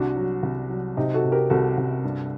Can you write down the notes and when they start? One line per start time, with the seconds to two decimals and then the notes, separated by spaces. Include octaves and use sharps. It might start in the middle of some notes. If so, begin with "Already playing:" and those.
Already playing: C2 D4 F#4
0.16 F#3
0.43 C2
0.70 F#3
0.97 C3 D#4 G4
1.14 F#4 A4
1.24 C3
1.32 G4 A#4
1.50 C2 F#4 A4
1.77 C2
2.04 G2